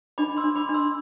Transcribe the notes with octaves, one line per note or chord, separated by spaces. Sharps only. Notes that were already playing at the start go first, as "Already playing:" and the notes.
D4 B5 D6
C6 E6
D4
B5 D6
D4
C6 E6